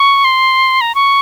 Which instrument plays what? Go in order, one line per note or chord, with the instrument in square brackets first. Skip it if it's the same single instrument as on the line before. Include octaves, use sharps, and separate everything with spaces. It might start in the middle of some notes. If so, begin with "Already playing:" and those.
Already playing: [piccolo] C#6
C6
A#5
C#6